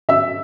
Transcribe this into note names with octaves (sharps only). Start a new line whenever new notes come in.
E5 E6